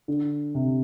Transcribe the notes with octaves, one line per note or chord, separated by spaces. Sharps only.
D3
C3